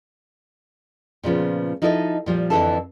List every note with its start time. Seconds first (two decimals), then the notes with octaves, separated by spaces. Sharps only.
1.23 A#2 C#3 F3 B3
1.82 F3 D#4 E4 A4 D5 D#5
2.26 A#2 F3 G3
2.50 F2 G#2 D3 E3 A4 A5